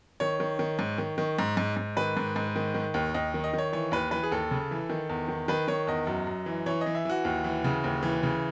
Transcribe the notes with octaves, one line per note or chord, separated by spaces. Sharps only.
D#3 C#5
D#3
D#3
G#2
D#3
D#3
G#2
G#2
G#2
D#3 B4
G#2
G#2
D#3
D#3
D#2
D#2 D#5
D#3
D#5
D#3 C#5
E3 C#5
D#2 B4
E3 B4
G#4
D#2 A4
C#3
E3
D#3
E2
D#3
D#3 B4
D#3 C#5
E2 D#5
F#2
F#2
E3
E3 C#5
D#5
E3
E5
E3 F#4
D#2
E3
C#3
D#2
E3
C#3